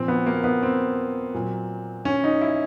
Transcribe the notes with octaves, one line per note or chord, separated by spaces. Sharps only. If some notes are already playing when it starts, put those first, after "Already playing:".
Already playing: A#2 F3 C4
B3
A#3
B3
C4
A#2 F#3
C#4
D#4
E4